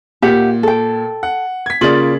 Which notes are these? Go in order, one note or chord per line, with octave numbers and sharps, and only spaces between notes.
A#2 G4 E5 F#5
A4 G5
F#5
G#6 B6
C#3 A#3 F4 D5 F#7